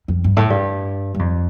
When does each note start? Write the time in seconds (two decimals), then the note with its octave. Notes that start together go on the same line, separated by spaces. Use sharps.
0.08 F2
0.24 G2
0.37 A2
0.50 G2
1.14 G2
1.19 F2